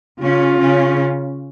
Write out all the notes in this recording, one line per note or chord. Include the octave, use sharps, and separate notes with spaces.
C#3 C#4 F4
C#3 C#4